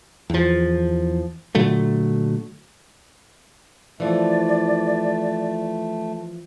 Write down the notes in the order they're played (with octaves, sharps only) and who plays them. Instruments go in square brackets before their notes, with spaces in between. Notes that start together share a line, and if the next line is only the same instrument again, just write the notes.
[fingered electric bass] E2 F3
A#2 D3 F#3 A3
[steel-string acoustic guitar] E3 F3 [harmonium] A3 [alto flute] D5